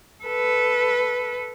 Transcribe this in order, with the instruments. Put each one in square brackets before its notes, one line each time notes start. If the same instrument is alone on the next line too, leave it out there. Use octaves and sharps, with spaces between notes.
[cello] A4 B4